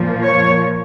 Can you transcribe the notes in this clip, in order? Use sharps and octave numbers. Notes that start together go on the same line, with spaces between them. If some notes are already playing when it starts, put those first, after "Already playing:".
Already playing: A#2 F3 A#3
C#5